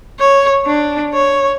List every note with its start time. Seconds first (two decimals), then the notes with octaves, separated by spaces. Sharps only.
0.19 C#5
0.66 D4
1.13 C#5